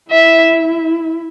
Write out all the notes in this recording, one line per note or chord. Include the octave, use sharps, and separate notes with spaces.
E4 E5